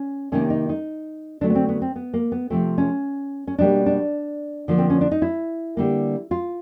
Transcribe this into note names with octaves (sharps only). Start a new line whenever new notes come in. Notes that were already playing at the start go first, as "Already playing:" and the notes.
Already playing: C#4
C3 D#3 G3 A#3 C#4
D#4
D#4
D3 F#3 A3 D4
B3
C4
B3
C4
B3
A#3
B3
C3 F3 A3 C4
C#4
C#4
B2 G3 A#3 D4
D4
D3 F3 A#3
C4
C#4
D4
D#4
E4
D3 G3 A#3
F4